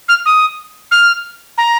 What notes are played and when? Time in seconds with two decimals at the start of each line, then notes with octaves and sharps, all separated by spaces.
0.09 F6
0.26 D#6
0.91 F6
1.58 A#5